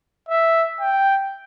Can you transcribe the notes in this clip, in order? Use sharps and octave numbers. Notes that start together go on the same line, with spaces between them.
E5
G5